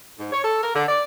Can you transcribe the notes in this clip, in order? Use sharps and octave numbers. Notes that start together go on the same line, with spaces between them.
G#2
C#5
A4
A#4
D3
D5